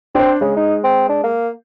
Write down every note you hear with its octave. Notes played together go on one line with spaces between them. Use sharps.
C4 D4 C5
C#3 G#3
D#4
C4
D4
A#3